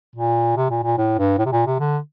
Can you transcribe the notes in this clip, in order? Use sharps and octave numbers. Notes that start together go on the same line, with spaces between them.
A#2
C3
A#2
A#2
A2
G2
A2
C3
A#2
C3
D3